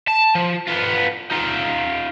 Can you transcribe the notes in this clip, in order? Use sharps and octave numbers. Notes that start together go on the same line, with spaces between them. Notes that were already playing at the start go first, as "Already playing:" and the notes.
A5
F3
B3 F4
D#4 F4